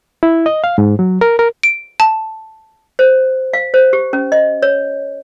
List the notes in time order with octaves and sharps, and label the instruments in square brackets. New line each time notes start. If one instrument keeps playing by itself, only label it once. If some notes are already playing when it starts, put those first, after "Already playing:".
[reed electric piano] E4
D#5
F5
G#2
F#3
A#4
A#4
[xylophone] D7
A5
[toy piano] C5
F5
C5
G4
C#4
D#5
C#5